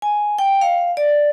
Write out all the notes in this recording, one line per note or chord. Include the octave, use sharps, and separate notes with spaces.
G#5
G5
F5
D5